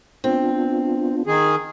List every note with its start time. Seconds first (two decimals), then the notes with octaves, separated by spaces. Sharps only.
0.24 B3 C4 D4 F4
1.27 D#3 G#4